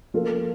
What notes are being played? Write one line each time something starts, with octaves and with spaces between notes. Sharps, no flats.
F3 A#3 F4 A4